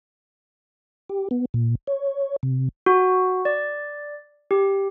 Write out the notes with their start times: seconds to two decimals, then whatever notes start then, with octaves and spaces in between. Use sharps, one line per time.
1.10 G4
1.31 B3
1.54 A#2
1.87 C#5
2.43 C3
2.86 F#4
3.45 D5
4.51 G4